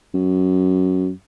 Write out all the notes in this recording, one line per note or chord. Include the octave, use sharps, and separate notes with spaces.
F#2